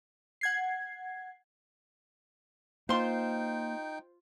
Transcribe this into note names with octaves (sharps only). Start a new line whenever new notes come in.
F#5 G#6 C7
A#3 D#4 F4 C5 F5 G5 C6